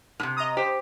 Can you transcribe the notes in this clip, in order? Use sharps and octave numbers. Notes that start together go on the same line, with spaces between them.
A2 C3
D#5 A#5 D#6
G4 C5